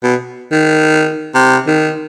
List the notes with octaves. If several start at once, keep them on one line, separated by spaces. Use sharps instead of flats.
B2
D#3
C3
D#3